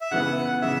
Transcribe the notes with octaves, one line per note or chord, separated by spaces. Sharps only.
E5
C#3 E3 B3 F#5
C#3 E3 E5